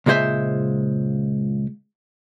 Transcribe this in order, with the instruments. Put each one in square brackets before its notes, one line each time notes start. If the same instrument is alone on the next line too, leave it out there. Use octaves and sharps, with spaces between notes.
[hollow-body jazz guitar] C#2 A#2 G#3 E4 C5 E5